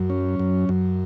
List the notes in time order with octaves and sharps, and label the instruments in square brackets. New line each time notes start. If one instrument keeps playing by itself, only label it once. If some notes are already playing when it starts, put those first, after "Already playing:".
Already playing: [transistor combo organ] F#2 [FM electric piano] F#3
[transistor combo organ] C#4
F#2
F#2